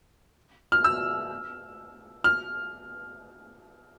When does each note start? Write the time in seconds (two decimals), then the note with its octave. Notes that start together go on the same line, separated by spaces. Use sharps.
0.72 F6
0.84 E6
2.24 F6